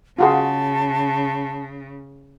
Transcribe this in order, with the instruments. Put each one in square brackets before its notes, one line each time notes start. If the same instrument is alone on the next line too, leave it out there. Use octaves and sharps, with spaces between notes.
[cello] C#3 [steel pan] F4 F#4 G#4 [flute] A5